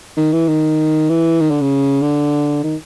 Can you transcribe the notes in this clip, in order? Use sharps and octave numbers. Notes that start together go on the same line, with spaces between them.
D#3
E3
D#3
E3
D#3
D3
C#3
D3
D#3